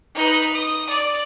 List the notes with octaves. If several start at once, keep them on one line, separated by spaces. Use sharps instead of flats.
D#4 B4
D#6
D5